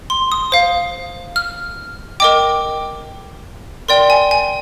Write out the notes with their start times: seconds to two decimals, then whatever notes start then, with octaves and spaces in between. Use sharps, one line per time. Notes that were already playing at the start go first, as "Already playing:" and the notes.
0.10 C6
0.32 D#6
0.52 C5 F5
1.36 F6
2.20 A#4 D#5 G5 D6
3.88 A#4 D5 G5 C6
4.10 G#5
4.31 G#5